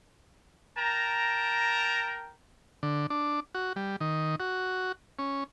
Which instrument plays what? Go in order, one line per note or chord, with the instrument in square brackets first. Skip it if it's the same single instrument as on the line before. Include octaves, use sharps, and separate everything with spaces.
[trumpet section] A#4 G5 A5 A#5
[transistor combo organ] D3
D4
F#4
G3
D#3
F#4
C#4